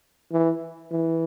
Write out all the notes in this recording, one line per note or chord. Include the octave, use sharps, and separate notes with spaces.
E3
E3